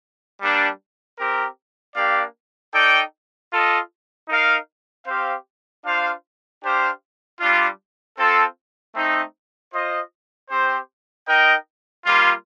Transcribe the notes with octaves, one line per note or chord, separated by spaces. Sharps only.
G3 A#3 D4 G4
C4 G4 A#4
A#3 D4 G4 D5 F5
D#4 A4 D5 G5
F4 A4 D#5
D#4 A#4 F5
C4 G4 C5 F5
D4 F4 C5 F5
D4 G4 C5 F5
G3 D4 F4
C4 F4 A4 C5
A3 C4 D#4
F4 C5 D#5
C4 G4 C5
D#4 A#4 D#5 G5
G3 A#3 F4